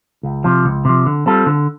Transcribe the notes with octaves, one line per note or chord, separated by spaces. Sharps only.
C#2
C3 F3
C#2
C3 F3
D3
G3 C4 F4 A4
D3